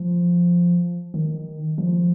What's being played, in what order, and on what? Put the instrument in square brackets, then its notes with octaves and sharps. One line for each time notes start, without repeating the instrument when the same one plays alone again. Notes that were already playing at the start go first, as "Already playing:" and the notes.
Already playing: [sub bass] F3
D#3
F3